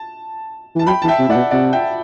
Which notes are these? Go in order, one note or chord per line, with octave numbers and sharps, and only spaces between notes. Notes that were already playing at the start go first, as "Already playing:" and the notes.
Already playing: A5
E3 A5
F#3 G5 B5
E3 A5
E5 G5
C3
A2 D5 F#5
B2
C3 D5 F#5
E5 G5